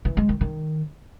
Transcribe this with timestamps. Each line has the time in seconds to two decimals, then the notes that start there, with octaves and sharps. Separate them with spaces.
0.05 E3
0.17 G#3
0.29 D#3
0.41 D#3